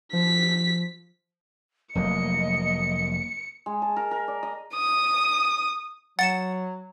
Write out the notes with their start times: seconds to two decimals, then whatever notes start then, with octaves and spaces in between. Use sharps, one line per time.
0.13 F3 B6
1.95 F1 F#3 A#3 D#5 C#7
3.66 G#3
3.82 A5
3.96 A#4
4.11 A#4
4.28 D5
4.43 D#5
4.74 D#6
6.19 F#3 F#5 A6 C#7 E7